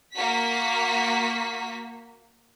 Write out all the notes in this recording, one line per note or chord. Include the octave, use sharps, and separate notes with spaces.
A#3 F#4 B6